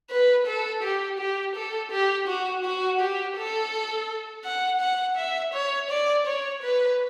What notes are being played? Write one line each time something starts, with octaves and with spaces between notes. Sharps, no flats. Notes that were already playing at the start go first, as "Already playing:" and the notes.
B4
A4
G4
G4
A4
G4
F#4
F#4
G4
A4
F#5
F#5
E5
C#5
D5
C#5
B4